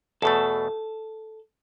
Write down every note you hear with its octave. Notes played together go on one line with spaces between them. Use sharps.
E2 B2 A3 A4